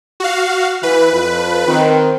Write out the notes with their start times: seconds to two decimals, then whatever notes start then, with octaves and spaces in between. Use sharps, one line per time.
0.20 F#4 F5
0.83 E3 B4
1.13 F2 F4
1.67 D#3 C4